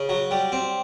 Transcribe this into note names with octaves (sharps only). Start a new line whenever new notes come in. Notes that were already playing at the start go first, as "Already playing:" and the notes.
Already playing: C#3
F#3
G3
C4